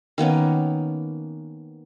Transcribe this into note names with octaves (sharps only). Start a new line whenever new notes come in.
D#3 A#3 B3 C#4